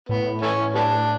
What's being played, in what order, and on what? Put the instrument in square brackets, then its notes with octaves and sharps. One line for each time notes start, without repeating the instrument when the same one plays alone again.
[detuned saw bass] A2 [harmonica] B3
[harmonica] E3 A3 C#4
G3 B3 D4